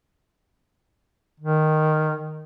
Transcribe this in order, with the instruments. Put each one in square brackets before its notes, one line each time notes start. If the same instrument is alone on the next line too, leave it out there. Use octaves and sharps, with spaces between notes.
[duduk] D#3